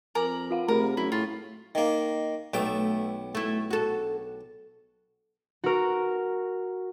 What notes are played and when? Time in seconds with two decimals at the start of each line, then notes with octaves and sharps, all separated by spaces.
0.15 F2 A#4 G#5 D6 F#7
0.51 F4 F5 F#5
0.68 C3 A3 G#4 A#4 B5
0.97 F#2 E4
1.12 A2 F4
1.75 D#3 A#3
2.54 B1 A3 B3 G5
3.35 A3 E4
3.70 F#4 A4
5.64 F#4 A#4